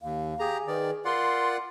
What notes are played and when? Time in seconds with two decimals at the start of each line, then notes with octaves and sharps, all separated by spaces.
0.02 D#2 F5
0.40 G4 G#4 A#5
0.68 D#3 B4 D5
1.05 F4 A#4 D5 F#5 C6